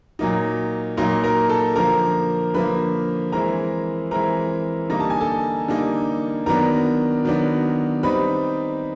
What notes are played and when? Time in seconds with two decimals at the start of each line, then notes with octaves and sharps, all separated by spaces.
0.19 A#2 F#3 A#3 D#4
0.97 A#2 F#3 A#3 D#4 A#4 A#5
1.24 A#4 A#5
1.49 A4 A5
1.76 D3 F3 A#3 A#4 A#5
2.54 D3 F3 A#3 B4 B5
3.32 E3 G#3 C4 E4 A#4 A#5
4.11 E3 G#3 C4 E4 A#4 A#5
4.90 D3 G3 A#3 D#4 A#5
5.00 A5
5.10 G#5
5.21 A4 A5
5.68 D3 G3 A#3 D#4
6.46 D#3 F#3 B3 D4 A#4 A#5
7.25 D#3 F#3 B3 D4
8.03 D#3 G3 C4 D#4 B4 B5